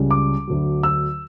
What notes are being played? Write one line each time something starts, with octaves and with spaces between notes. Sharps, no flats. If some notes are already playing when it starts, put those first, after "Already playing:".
Already playing: C#2 C#3 G3 C#4
D6
D2 D3 F#3
E6